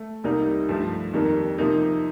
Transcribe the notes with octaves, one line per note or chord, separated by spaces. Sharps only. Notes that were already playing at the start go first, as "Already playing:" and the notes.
Already playing: A3
C2 C3 G3 A#3 D#4
G2 F3 A3
F2 D#3 G3 A#3
C3 F3 A#3 D#4